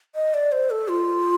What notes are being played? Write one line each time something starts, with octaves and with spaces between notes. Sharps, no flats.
D#5
D5
C5
A4
F4